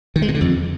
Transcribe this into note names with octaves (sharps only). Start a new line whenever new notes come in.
D#3
G#3
B2
D3
F2